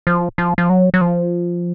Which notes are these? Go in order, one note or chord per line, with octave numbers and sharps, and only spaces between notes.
F3
F3
F3
F#3
F#3
F3